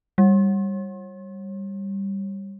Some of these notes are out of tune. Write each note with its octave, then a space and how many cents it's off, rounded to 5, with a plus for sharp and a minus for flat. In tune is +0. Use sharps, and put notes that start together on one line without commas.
G3 +5